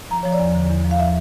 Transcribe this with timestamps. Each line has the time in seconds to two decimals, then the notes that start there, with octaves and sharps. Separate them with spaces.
0.10 F3 A#5
0.23 F3 C#5
0.32 D5
0.40 E2
0.55 D3
0.70 E2
0.84 F3
0.91 F5
0.99 E5